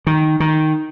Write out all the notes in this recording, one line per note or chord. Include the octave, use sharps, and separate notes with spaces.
D#3
D#3